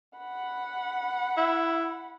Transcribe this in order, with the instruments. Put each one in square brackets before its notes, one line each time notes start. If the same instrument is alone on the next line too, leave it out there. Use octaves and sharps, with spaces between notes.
[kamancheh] F#5 B5
[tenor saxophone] E4